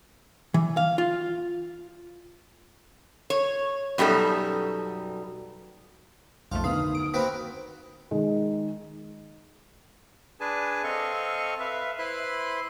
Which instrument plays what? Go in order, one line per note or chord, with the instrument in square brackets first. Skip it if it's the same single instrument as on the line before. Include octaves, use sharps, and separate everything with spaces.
[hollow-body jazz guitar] E3
F5
F4
[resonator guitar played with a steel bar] C#5
F#2 B2 G3 D#4 A4
[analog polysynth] B1 F2 A3 [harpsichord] F4
[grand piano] D2 D#3 B3 [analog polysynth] F5 [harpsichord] B5 [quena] D#6
[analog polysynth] D7
[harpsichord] A#3 C4 F#4 [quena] B4 [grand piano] B6
[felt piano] D#3 G#3
[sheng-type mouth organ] D4 G#4 B4 G#5 A5
C4 A4 D#5 F5 C#6
B4 E5 F5
E4 B4 C5 B5 C6 F#6